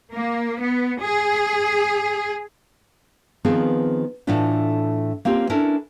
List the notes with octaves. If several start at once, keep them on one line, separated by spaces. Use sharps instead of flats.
A#3
B3
G#4
D#3 F3 B3 C4 G#4
A2 E3 A3 D4 F4
A#3 C4 C#4 F4 G4
C#4 D4 E4 A4 A#4